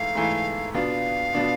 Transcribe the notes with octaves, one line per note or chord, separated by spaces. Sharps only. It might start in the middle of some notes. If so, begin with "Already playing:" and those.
Already playing: G#2 E3 A3 E4 F5
G#2 E3 A3 E4
B2 B3 D4 F4 F5
B2 B3 D4 F4